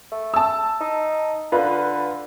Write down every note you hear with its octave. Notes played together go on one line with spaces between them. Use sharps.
A3
A5 E6
D#4
D3 F4 B4